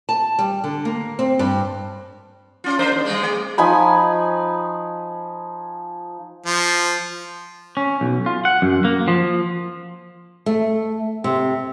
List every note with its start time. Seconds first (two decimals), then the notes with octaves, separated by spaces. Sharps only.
0.09 A5
0.39 G3
0.64 D3
0.85 A#3
1.19 C4
1.39 G2
2.64 C#4 F4
2.79 D4 A#4 C5
2.92 D#2
3.05 G3 G#3
3.22 A3
3.58 F3 D#4 G#5 B5
6.46 F3
7.77 C#4
8.01 B1
8.26 F4
8.45 F#5
8.62 F#2
8.85 A#3
9.08 F3
10.46 A3
11.24 C3